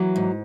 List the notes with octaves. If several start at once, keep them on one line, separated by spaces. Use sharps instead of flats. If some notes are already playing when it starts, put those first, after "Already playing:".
Already playing: E3 F#3 A#3
G#2